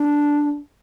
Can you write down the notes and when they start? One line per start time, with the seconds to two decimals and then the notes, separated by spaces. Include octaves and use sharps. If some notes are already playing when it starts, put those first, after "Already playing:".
Already playing: D4